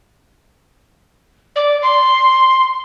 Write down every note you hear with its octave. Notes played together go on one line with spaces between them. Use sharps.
D5
C6